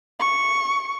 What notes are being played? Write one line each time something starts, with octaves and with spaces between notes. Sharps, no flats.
C#6